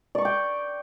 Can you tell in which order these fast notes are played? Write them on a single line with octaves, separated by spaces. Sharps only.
D5 C#6 D6 G5